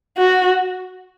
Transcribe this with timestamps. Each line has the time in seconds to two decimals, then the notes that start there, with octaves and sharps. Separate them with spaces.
0.18 F#4